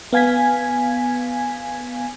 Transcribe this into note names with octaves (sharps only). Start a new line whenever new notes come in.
B3 F5 G#5 G#6 B6